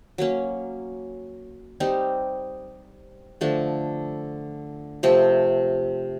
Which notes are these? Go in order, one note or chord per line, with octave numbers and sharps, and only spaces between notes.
F#3 A#3 C#4
G3 C4 D#4
D3 F3 A3 D4
C3 F3 A3 C4